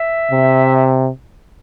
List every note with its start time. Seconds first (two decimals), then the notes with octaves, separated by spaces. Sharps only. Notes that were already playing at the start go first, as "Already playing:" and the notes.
Already playing: E5
0.31 C3